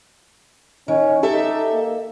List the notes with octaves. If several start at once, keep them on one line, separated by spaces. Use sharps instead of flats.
D#3 C#4
D#4 G4 A4 E5
A#3